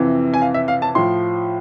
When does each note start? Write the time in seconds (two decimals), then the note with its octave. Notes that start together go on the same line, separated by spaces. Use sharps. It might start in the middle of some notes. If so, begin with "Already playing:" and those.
Already playing: F2 C3 E3
0.34 G#5
0.42 F5
0.54 E5
0.68 F5
0.82 A5
0.95 A2 F3 C6